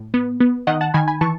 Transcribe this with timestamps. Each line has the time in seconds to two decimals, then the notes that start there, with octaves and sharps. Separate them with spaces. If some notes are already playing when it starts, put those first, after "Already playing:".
Already playing: A2
0.14 B3
0.40 B3
0.67 D#3 D#5 F#5
0.81 F#5 A5
0.94 D#3 G#5 B5
1.08 G#5 B5
1.21 E3 A5 C#6